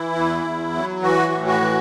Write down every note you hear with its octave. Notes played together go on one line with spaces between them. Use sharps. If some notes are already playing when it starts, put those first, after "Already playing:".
Already playing: E3 E4
E2
E2
F#3
E3 F#4
A2
F#4
E3